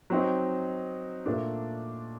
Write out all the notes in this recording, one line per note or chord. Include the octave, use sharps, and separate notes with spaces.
F#3 C4 D#4
A#2 A3 D4